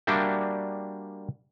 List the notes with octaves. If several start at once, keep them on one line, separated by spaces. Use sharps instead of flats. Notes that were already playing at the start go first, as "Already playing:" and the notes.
G3 A#3 D4 F#4 E5 G5